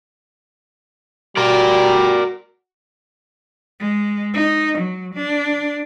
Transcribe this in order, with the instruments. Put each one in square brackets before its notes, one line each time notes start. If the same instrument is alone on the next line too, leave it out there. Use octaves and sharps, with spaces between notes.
[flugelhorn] G3 [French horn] F#4 [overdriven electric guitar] A#4 D5
[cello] G#3
D#4
F#3
D4